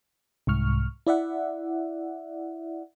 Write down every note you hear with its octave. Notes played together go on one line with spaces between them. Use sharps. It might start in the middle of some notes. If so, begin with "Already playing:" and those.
C2 G#2 C#6 F6
E4 D5 E5 F#5